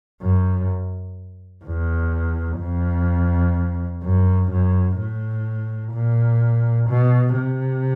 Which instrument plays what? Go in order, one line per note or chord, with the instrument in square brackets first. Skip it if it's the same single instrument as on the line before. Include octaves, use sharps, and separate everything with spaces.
[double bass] F#2
E2
F2
F#2
F#2
A2
A#2
B2
C3